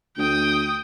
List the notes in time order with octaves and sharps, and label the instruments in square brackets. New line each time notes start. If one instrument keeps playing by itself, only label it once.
[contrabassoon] D2 [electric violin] G5 D#6